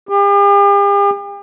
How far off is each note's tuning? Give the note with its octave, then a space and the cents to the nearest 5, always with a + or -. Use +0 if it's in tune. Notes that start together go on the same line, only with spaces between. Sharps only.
G4 +45